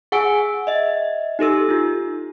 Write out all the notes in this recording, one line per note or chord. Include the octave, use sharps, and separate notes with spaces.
G#4 F#5 G#5 E6 D7
D#5 E5
D#4 G4 A4 E6
D#4 F4